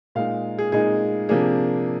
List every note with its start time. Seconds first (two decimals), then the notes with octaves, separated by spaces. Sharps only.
0.15 A#2 G#3 D#4 F5
0.58 G#4
0.72 A#2 G#3 D#4 G#4
1.29 C3 F3 A#3 D4 G#4